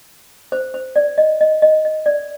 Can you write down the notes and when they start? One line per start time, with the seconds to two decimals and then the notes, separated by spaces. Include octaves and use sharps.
0.52 C5
0.74 C5
0.96 D5
1.18 D#5
1.41 D#5
1.62 D#5
1.85 D#5
2.06 D5